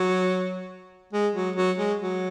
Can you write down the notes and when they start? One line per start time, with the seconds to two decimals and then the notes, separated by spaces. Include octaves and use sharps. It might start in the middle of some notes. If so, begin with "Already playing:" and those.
Already playing: F#3
1.13 G#3
1.35 F#3
1.56 F#3
1.78 G#3
2.01 F#3